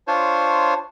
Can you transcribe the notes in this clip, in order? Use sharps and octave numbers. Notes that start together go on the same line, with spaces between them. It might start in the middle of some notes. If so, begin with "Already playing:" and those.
D4 F4 C5 C#5